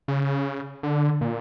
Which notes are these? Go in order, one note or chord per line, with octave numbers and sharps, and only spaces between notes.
C#3
D3
A#2